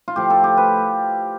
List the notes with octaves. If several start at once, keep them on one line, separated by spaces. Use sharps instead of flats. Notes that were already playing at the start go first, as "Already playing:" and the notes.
F4
A2 F3 G4
A4
G4
B4